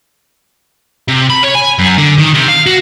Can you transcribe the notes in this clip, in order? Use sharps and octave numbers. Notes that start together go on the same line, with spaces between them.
C3
B5
C#5
G#5
F#2
D3
D#3
C3
F5
F#4